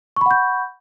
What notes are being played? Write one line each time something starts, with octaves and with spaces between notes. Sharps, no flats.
F#5 B5 C#6 G6